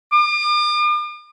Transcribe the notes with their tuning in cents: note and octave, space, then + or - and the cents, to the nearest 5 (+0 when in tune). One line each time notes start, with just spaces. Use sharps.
D6 +45